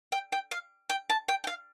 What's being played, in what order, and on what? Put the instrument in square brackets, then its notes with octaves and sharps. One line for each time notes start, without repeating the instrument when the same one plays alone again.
[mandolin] G5
G5
F5
G5
A5
G5
G5
F5